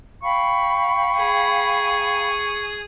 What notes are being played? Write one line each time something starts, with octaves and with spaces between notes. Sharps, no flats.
F5 G5 B5 C#6
G#4